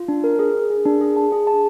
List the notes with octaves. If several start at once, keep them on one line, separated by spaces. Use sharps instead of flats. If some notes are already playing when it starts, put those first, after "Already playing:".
Already playing: F4
D4
A#4
G#4
G#4
G#4
D4
G#4
A5
G#4
A5